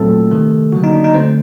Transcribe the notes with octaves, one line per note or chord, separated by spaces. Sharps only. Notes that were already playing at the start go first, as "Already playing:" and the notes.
Already playing: A#2 F#3 A3 C4 A4
C3 D#3 A3
D3 F#3 A#3 F#4
D#4
D4
D#4
D3 A3 C4 C5